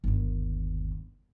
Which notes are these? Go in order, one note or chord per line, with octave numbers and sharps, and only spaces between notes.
G1 D#2